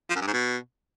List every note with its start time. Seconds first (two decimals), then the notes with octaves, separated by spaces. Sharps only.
0.10 F3
0.16 F#2
0.22 G2
0.27 G#2
0.33 B2